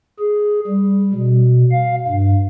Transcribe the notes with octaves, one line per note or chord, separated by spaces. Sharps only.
G#4
G3
B2
F5
G2